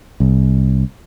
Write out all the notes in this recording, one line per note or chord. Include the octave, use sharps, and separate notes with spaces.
C2